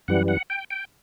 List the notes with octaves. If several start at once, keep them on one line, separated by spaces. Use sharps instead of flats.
F#2 E3 G3 F#5
F#5
G5
G5